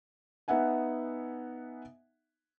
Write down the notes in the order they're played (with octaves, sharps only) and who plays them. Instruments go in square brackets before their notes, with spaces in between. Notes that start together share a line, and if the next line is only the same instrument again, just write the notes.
[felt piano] B3 D#4 E5 F#5 G#5